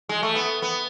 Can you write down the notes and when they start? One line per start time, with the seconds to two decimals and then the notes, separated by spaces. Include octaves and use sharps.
0.09 G#3
0.23 A3
0.35 B3
0.62 B3